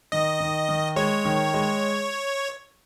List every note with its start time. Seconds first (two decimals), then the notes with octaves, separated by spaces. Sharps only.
0.12 D#3 D#5
0.40 D#3
0.69 D#3
0.96 G#3 C#5
1.25 D#3
1.54 G#3